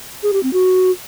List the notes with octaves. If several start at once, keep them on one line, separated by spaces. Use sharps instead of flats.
G#4
G4
C4
F#4